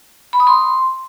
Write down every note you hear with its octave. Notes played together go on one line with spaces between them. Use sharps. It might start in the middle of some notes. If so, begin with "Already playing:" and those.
B5
D#6
C6